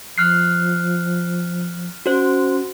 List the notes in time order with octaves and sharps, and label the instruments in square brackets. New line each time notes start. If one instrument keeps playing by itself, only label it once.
[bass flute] F3 [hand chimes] F6 F#6 C7
[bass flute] C#4 [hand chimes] F#4 C5